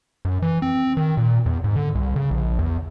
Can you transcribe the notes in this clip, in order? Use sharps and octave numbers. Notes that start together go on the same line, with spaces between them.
F#2
E3
C4
D#3
A#2
E2
G#2
D3
C2
C#3
A#1
E2